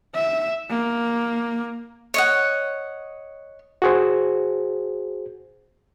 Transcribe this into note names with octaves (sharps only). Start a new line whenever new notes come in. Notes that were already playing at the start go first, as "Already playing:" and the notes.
E5
A#3
C#5 D#5 F#5
F#4 G#4 C5